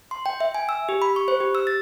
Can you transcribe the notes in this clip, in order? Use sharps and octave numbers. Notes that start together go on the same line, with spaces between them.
C6
G5
E5
G#5
E6
G4
B5
C#6
C5
G4
E6
A6